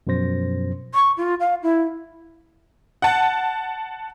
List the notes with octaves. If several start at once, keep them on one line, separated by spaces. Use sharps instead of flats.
F#2 B2 F3 C5 A#6
C#6
F4
F5
E4
F#5 A5